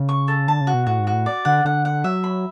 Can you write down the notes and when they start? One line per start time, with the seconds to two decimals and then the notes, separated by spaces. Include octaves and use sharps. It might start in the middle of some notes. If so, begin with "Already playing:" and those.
Already playing: C#3
0.09 C#6
0.28 A4
0.48 D3 A5
0.61 C#3
0.67 F#4
0.74 B2
0.87 A2 F#4
1.00 G#2
1.07 F#4
1.13 A2
1.26 D5
1.45 D3 F#5
1.65 D3 F#5
1.85 F#5
2.04 F#3 E5
2.24 B5